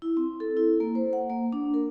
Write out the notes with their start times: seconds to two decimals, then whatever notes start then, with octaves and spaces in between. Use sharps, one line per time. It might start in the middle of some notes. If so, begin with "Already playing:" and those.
0.02 E4
0.17 C4
0.40 A4
0.57 E4
0.80 A#3
0.95 C5
1.13 F#5
1.30 A#3
1.53 D4
1.74 A#4